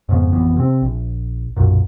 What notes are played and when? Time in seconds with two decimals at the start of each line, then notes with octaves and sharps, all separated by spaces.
0.09 F2 G#2 C#3 B3
0.32 A1 F2 E3 B3
0.57 C3 C4
0.82 A#1
1.56 B1 F#2 A#2